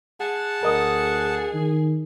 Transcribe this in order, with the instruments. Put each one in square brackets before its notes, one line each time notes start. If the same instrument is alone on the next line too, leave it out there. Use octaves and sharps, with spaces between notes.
[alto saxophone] G#4 [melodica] F#5 A5
[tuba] D2 [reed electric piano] A#4 D#5 D#6
[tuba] D#3